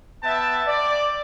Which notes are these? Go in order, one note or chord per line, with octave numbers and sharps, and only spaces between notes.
B3 E5 G5 A5
D5